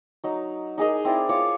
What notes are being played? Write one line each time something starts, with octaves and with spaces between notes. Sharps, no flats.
F#3 D#4
D#4 G#4 A#4 D#5
C4 E4 D5
F4 C#5 D6